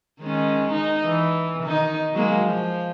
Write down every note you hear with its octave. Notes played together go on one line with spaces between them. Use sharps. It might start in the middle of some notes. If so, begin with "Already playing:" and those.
D#3 G#3 C#4
D#4
E3
D#3 D#4
F#3 G#3 A#3
F3